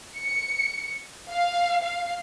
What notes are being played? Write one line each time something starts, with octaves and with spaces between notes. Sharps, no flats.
C#7
F5
F5